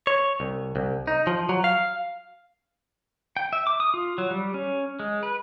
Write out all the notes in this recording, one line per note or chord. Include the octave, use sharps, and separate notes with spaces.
C#5
C2
C2
D#4
F3
F#3
F5
G5
E5
D6
D#6
F4
F#3
G3
C#4
G#3
B4